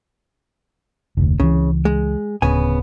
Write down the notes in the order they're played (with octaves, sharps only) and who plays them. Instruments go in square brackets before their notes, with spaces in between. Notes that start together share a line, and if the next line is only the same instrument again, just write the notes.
[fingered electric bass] F1 D2
[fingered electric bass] C#2 E3 [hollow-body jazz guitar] C#3
[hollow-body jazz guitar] G#3
[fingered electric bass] D1 [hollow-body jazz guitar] C#3 B3 G#5